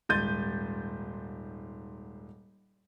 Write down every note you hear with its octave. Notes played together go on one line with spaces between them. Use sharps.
D#1 G#2 C6 G6 A6 D#7